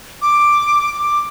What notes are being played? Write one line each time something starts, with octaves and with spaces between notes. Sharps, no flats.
D6
D6